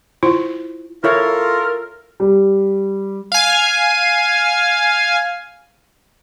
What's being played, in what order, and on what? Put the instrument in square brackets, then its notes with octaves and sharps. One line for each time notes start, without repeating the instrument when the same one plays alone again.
[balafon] E4 F4 C5
[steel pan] E4 C#5 F5 [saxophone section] F4 A#4 [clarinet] A4
[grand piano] G3
[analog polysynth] F5 G#5